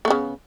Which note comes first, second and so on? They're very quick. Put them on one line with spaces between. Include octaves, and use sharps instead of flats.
A3 B3 C#3